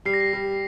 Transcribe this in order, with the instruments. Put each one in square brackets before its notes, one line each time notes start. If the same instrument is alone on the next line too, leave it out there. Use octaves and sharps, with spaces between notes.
[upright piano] G3 [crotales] C7
[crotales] A#6
C7
[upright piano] G3